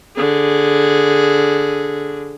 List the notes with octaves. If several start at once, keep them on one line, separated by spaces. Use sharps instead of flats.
D3 G#4